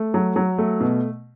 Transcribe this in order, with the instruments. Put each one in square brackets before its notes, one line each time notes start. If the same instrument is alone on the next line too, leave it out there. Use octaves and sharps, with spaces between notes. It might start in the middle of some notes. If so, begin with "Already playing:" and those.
Already playing: [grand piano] A3
F#3
F#3
A3
B2